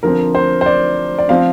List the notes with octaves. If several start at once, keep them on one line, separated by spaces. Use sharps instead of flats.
D3 F3 C4 A#4
C5
C5
D5
D5
F3 C4 F5